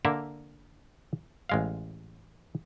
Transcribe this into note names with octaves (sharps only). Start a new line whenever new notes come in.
D3 A#3 A#4 E5
A1 G#3 F5